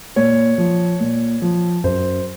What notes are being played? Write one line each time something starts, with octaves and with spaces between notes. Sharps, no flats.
A#2 C#5
F3
A#2
F3
F#2 C5